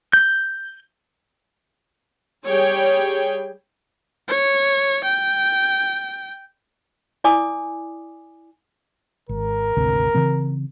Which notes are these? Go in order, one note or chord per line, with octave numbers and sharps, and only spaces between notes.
G6
G3 G#4 C#5 G5
C#5
G5
E4 D5 G#5 D6 D#6
G#1 A#4
G#1 D2 C3
C#3 E3 C4